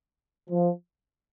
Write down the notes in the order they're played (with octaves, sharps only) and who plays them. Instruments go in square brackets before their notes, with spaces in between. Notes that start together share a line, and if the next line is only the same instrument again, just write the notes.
[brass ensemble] F3